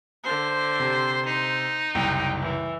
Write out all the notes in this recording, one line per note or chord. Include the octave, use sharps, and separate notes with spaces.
D3 C5
C3 C6
D#4 C5
F#1 C2 G5
E3